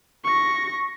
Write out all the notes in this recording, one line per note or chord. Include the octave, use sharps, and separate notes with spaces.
C#6 A#6